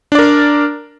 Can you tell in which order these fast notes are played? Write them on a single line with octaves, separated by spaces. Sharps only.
D4 D5 A#4